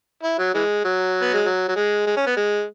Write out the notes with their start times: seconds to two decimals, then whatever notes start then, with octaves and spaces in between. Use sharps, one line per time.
0.23 E4
0.39 F#3
0.54 E3 G#3
0.84 F#3
1.22 B3
1.34 G#3
1.45 F#3
1.69 F#3
1.76 G#3
2.07 G#3
2.17 C#4
2.27 B3
2.37 G#3